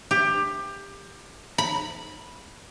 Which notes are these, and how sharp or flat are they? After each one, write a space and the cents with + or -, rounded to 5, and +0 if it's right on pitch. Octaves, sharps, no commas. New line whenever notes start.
G4 +20
B5 -10